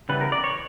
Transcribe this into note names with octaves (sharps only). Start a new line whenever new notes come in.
C#3 E3 G3 B3 B4
A#4
D5
C#5